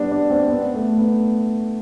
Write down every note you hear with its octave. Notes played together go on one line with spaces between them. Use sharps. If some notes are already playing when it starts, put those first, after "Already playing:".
Already playing: G3 B3 D4
D4
C4
B3
A3
B3